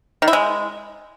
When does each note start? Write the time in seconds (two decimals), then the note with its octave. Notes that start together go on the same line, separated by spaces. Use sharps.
0.22 D#3
0.28 E4
0.33 G#3